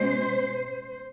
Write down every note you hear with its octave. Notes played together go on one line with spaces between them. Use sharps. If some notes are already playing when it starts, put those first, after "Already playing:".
Already playing: B2 G#3 C#4 C5